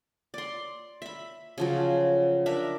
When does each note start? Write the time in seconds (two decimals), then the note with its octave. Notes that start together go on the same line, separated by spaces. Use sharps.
0.34 D5 C6
1.02 E5 B5
1.58 C#3 F3 F#3
2.46 D4 A#4 E5